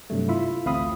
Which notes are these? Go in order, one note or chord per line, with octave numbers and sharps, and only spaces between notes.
G2 C3 F#3 A3
E4 F4 E5
A1 D2 C4 F5 B5 D#6